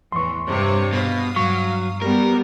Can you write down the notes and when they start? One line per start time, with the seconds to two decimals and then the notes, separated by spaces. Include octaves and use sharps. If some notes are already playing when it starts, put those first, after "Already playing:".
0.12 E2 A2 E3 C6 C#6
0.45 G2 C3 C#5
0.93 B2 F5 D#6
1.36 G2 F#3 C#6
2.02 G3 B3 A#4